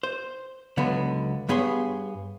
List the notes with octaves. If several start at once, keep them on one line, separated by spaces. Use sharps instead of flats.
C5
C#2 D3 F#3 B3
G2 B3 G#4 C#5 C6